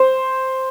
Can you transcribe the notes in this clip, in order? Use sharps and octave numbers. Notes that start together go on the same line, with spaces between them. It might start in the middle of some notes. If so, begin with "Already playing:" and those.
Already playing: C5